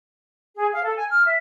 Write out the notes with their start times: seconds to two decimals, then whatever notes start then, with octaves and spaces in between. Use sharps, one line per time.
0.55 G#4
0.71 F5
0.84 A4
0.96 G#5
1.09 F6
1.24 E5